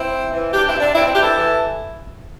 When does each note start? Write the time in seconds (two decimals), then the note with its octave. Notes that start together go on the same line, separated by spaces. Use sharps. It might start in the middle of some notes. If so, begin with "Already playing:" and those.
Already playing: C4 E4
0.13 C3
0.32 E3
0.53 E3 D4 G4
0.66 C4 E4
0.73 C3
0.80 D4
0.93 C3 C4 E4
1.04 C4 E4
1.13 E3 D4 G4
1.23 E4 A4
1.34 E3